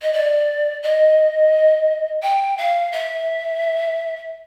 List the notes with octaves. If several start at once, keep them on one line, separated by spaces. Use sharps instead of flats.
D#5
D5
D#5
G5
F5
E5